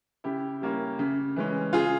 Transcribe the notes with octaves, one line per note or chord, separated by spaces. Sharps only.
C#3 E4 G4
G3 A#3 C#4 E4
C#3
E3 G#3 C#4
C#3 F4 G#4